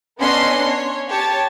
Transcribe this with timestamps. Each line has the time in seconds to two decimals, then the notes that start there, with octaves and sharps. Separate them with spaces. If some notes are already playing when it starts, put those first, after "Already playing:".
0.20 B3 C#4 D4 D#5 C6 C7
0.64 C#5
1.08 G4 C#5 A5